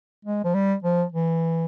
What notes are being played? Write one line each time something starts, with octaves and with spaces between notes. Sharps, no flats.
G#3
F3
G3
F3
E3